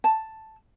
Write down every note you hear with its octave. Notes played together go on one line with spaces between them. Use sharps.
A5